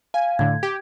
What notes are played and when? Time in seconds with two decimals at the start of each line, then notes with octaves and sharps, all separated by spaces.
0.14 F5 G#5
0.39 A2 D3 G#6
0.63 G4